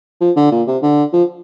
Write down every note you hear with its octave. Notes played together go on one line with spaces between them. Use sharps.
F3
D3
A#2
C3
D3
F3